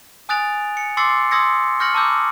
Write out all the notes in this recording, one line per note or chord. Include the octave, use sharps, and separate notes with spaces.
G#5 D#6 F#6 A6 D7 F7
C#7
C6 D6 E6 A6 C7 C#7
C6 D#6 E6 G#6 A#6 C#7
C#6 F6 G6 A#6 C#7 F#7
A5 A#5 D6 E6 G6